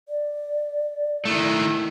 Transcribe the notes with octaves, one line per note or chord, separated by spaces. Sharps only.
D5
D#3 A3 E4